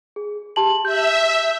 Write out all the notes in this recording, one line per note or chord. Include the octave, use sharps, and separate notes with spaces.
G#4
G4 A5 F#7
E5 G6